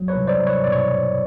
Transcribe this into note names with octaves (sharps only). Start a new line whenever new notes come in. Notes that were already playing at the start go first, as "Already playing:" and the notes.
Already playing: F#3
B4 C#5
C2
C5 D5
C2
B4 C#5
B2 D5
C#5